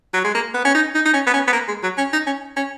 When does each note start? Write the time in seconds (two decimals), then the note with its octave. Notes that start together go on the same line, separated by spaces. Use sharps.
0.14 F#3
0.24 G#3
0.35 A#3
0.54 B3
0.65 C#4
0.75 D#4
0.95 D#4
1.05 D#4
1.13 C#4
1.27 B3
1.34 C#4
1.47 B3
1.53 A#3
1.68 G#3
1.83 F#3
1.98 C#4
2.13 D#4
2.26 C#4
2.56 C#4